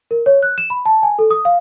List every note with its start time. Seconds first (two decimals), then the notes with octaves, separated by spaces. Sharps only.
0.11 A#4
0.26 C#5
0.43 F#6
0.58 E7
0.70 B5
0.86 A5
1.03 G#5
1.19 A4
1.31 D#6
1.45 F5